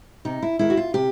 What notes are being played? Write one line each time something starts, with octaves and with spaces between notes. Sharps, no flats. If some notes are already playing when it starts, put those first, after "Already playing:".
C3 D#4
E4
D#3 G#3 E4
F#4
F4
C3 G4